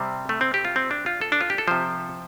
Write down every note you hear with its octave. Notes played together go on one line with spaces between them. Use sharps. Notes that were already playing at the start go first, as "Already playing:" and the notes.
Already playing: C3 G3 C4
A3
C4
G4
F4
C4
D4
F4
A4
D4
F4
G4
A4
C3 F3 C5